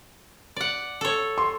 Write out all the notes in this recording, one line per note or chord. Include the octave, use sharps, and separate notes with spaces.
D5 F#5
A4 C#5
C6